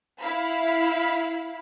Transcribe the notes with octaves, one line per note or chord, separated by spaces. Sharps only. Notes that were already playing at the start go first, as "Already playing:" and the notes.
E4 F5 B5